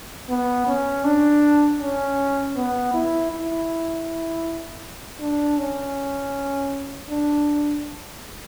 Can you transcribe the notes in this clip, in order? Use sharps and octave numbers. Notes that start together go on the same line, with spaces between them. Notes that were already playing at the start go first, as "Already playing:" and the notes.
B3
C#4
D4
C#4
B3
E4
E4
D4
C#4
D4